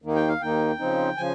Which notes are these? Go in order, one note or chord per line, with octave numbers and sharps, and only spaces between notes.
D#2 D#3 A#3 D#4
G5
F5
D#2 D#3 A#3 D#4 G5
C#3 F3 C4 D#4
C#3 F3 G#5